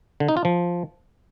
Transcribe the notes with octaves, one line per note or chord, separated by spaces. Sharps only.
D3
D#4
F4
F3